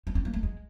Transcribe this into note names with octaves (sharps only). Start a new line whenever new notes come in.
B3
C4
A#3
A3
G#3